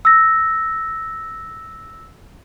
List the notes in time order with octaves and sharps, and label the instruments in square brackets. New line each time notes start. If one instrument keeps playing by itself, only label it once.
[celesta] E6 A#6